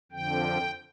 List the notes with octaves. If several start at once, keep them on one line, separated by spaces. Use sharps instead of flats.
F2 D3 F3 G5